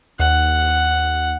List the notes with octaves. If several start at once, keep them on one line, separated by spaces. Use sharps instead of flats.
D#2 F#5